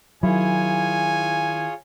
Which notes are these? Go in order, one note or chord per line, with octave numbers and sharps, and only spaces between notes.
D#3 F#3 E4 F4 G#4 C#5 G#5